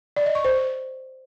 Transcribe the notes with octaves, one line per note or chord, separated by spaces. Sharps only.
D5
D#5
C#6
C5